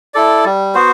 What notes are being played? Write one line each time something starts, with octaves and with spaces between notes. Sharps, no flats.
E4 A4 D5
G3
B3 F#4 C5